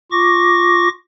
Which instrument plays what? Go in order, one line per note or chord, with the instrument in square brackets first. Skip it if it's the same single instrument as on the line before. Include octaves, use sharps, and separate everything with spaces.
[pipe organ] F4 C#6 D6 A#6